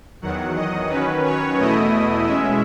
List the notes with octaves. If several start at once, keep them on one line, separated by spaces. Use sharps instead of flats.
E2 D#3 F#3 F#5
D#5
D#3 F#3 C#4 B4
C#5
E2 B2 A3 E4 D#5
B2 G#3 C#4 E4 E5